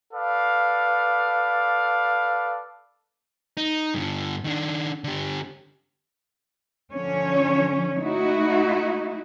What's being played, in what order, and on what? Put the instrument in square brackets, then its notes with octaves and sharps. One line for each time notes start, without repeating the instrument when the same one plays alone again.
[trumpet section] A4 B4 D5 F5
[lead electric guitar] D#4
G2 D3
D#3 D4
D3 G4
[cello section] D3 F3 C#4 C#5
A3 D#4 E4 F#4